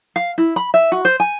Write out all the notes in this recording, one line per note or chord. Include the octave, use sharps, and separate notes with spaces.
F5
E4
B5
E5
F#4
C5
G#5